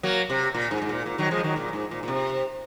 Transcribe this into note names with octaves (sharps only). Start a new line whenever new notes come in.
F#3 A#3
C3
A#2
G#2
G#2
A#2
A#2
D#3 F#3
F3 G#3
D#3 F#3
A#2
G#2
A#2
A#2
C3